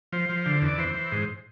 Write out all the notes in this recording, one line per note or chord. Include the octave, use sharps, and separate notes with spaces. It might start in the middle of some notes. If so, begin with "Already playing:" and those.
F3 C5
F3
D3
E2
D5
E3 C5
E3
G#2